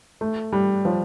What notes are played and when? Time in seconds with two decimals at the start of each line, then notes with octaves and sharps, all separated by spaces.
0.21 A3
0.52 G3
0.85 F3